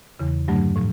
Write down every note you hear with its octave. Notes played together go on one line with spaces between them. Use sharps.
E2 C#3 E3
G2 D3 F#3 A3 D4
A2 F3